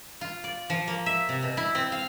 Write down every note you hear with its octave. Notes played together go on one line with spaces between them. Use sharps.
F4
D5
F3
A#3
E5
C3
B2
E4
C4
F5